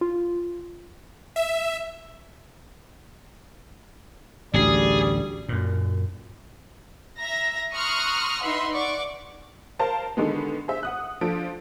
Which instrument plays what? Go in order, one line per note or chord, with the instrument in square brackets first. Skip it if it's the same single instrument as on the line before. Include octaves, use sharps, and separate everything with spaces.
[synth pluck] F4
[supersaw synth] E5
[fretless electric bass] A1 D2 [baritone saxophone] G3 [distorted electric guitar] G#4 [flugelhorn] D5
[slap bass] F#2 A#2
[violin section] E5 A#5 A#6
A#5 C6 C#6 D#6 F6 F#6
D#4 B4 E5 F#5 C6
D5 F#5 C#6 D6
[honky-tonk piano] A#4 C5 F5 A5 A#5
D3 D#3 G#3 B3
G#4 C5 E5
F#5 D#6 F#6
F3 D4 A4 D7